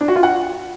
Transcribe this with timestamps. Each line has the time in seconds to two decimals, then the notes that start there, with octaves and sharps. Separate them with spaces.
0.01 D4
0.08 F#4
0.16 F4
0.23 F#5